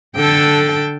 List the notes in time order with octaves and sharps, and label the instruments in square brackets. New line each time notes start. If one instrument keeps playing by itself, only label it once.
[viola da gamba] D3 [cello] A4 G5